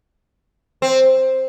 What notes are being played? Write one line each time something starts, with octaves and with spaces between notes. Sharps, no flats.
C4